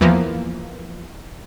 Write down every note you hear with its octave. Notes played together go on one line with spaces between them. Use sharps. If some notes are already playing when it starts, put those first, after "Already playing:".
E2 E3 F3 A#3 B3